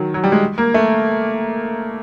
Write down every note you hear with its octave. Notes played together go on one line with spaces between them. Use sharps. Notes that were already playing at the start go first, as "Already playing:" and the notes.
Already playing: D#3 F#3
F#3
G3
G#3
A#3
A3